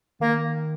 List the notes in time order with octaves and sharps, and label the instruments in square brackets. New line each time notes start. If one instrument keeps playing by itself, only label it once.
[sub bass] D#3 [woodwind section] A#3